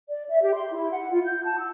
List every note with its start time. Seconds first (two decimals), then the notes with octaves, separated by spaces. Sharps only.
0.08 D5
0.29 E5
0.42 G4
0.54 C6
0.72 E4
0.91 F#5
1.10 F4
1.25 G6
1.45 A5
1.58 E6